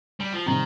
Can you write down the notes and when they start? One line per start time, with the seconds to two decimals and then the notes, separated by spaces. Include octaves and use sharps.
0.20 G3
0.33 F3
0.46 C3 D#3 G3 C4